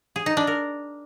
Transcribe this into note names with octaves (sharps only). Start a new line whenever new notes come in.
G#4
D#4
D4
A#4